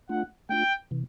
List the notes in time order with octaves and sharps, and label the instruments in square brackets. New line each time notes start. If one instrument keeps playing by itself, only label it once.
[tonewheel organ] A3 D4 F4 [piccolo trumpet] F#5
[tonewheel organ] A3 D4 F4 [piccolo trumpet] G5
[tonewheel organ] C3 E3